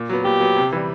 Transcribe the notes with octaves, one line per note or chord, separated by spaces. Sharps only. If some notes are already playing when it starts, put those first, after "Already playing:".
Already playing: A#2
F#3 B3
A#2 G4
F#3 B3
C3
E3 G3